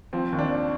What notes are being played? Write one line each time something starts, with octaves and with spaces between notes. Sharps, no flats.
F3 C4
D#2
D4